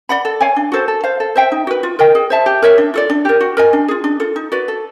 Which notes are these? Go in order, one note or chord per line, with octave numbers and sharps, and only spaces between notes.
D5 F#5 B5
A4
C#5 F5 G#5
D4
F#4 A4 C5
A4
C5 F5
A4
C5 E5 G5
D#4
F#4 B4
F4
A#4 D#5 G5
G#4
C5 E5 A5
G4
A#4 C#5 E5
D4
F4 A4 D5
D4
G4 A#4
F#4
A#4 D#5 G#5
D4
F4 G#4
D4
F4 A4
D#4
F#4 B4 D5
A4